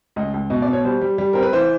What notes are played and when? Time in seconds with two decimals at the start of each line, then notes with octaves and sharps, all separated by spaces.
0.16 C#2 D#5
0.34 C#2
0.50 B2 D#5
0.62 D5
0.68 B2
0.73 C#5
0.84 G3 C5
1.01 G3
1.18 G3
1.33 C4 A#4
1.43 B4
1.53 E3 C5